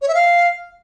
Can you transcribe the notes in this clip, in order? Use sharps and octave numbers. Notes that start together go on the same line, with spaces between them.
C#5
E5
F5